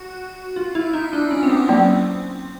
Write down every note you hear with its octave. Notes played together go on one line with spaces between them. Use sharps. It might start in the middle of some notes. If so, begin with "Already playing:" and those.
Already playing: F#4
F4
E4
D#4
D4
C#4
C4
B3
F#3 A#3 C4 C#4